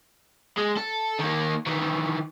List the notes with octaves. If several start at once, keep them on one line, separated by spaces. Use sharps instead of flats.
G#3
A4
D#3 A#3
D#3 E3